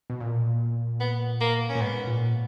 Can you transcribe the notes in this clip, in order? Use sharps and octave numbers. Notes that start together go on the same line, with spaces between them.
B2
A#2
B3
A#3
C#4
A#2
G#2 B3
A#2